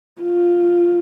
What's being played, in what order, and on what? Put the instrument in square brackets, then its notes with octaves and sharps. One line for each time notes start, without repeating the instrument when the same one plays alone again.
[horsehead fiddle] F4